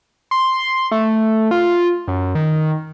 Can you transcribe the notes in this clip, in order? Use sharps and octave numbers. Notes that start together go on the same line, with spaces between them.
C6
A3
F4
F#2
D#3